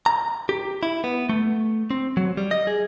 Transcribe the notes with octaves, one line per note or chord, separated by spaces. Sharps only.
A#5
G4
E4
B3
A3
C4
F#3
G3
D#5
G#4